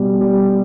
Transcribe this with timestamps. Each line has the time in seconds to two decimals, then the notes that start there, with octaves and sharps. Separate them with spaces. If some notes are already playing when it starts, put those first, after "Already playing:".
Already playing: B2 G3
0.21 G3